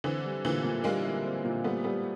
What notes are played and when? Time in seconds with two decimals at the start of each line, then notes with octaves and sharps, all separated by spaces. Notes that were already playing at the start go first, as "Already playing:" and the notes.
0.04 D3 E3 C4
0.24 G3
0.45 A#2 D3 E3
0.64 A#2
0.84 G3 G#3 A#3
1.04 E4
1.24 C4
1.45 A#2
1.64 G3 A3 B3
1.84 G3 A3 B3